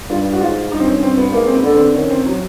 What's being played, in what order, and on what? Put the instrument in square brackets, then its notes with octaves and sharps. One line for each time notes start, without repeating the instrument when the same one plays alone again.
[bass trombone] G2 [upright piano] F4
[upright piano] F#4
[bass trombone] G#2 [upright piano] F4
[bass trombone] G2 [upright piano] D#4
[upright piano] C4
C#4
C4
B3
[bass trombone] G#2 [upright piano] A#3
[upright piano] C4
B3
[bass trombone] D3
[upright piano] C4
[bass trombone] D#3 [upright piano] C#4
[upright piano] C4
F#3